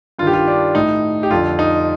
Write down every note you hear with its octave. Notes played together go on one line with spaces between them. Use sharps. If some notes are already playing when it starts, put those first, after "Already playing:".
G2 D#3 F4 G4
F4
D4
A2 D#4
G4
F2 D3 F4
D#4